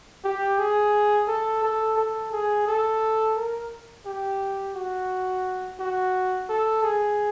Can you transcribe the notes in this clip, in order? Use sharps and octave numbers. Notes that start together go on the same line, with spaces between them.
G4
G#4
A4
A4
A4
G#4
A4
A#4
G4
F#4
F#4
A4
G#4